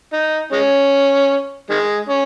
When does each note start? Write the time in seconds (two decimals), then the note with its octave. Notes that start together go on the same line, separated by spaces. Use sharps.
0.13 D#4
0.52 G#3 C#4
1.70 D#3 G#3
2.09 C#4